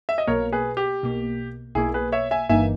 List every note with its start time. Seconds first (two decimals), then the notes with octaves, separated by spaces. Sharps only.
0.09 E5
0.18 D#5
0.27 B1 B2 A#3 A#4 C#5
0.53 G#4 B4
0.77 G4
1.02 B1 B2 A#3
1.75 B1 B2 A#3 E4 G#4
1.94 G#4 B4
2.12 C#5 E5
2.31 E5 G#5
2.49 G1 G2 E3 A#3 D#4 E5 G#5